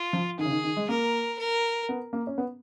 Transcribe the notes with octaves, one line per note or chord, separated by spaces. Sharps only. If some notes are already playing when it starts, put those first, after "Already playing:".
Already playing: F4
F3
D#3 G#4
C#3
D#3
D#3
G#3
A#3 A#4
A#4
B3
A#3
C#4
B3